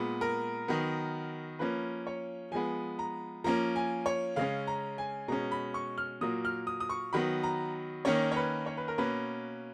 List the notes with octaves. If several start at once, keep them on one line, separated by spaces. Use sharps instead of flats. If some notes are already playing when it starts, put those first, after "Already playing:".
Already playing: A#2 G#3 B3
A#4
D#3 F#3 B3
F3 A#3 C#4 B4
C#5
F3 G#3 B3 G#5
A#5
F3 A#3 C#4 A#5
G#5
C#5
C#3 G#3 C#4 F5
A#5
G#5
B2 G#3 C#4 A#5
B5
C#6
F6
A#2 F#3 A#3 D#6
F6
D#6
D#6
C#6
D#3 F#3 B3 B5
A#5
D#3 A#3 C#4 C#5
C#5
B4
C#5
B4
A#4
B2 A#3 C#4 B4